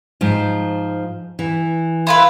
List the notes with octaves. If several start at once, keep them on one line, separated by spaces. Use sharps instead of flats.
G#2 F3
E3
E4 F4 B4